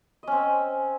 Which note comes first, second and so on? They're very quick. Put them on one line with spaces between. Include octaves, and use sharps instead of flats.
D#5 C#4 C4